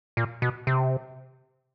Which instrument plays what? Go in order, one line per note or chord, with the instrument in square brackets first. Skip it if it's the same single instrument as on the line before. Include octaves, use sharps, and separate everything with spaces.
[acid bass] A#2
B2
C3